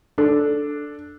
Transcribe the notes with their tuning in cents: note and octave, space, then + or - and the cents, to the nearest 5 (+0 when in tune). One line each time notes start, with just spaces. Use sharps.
D4 +0 A4 +0